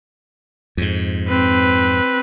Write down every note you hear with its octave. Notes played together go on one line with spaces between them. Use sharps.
F2 G#2
C4 B4